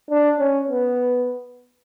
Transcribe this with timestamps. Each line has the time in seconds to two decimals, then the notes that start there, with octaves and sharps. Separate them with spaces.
0.10 D4
0.40 C#4
0.69 B3